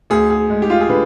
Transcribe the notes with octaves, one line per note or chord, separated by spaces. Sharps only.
D2 G#4
G#4
G#3
G4
F4
G#4
D3 B4